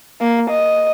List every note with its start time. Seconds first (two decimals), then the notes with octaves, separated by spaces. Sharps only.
0.21 A#3
0.51 D#5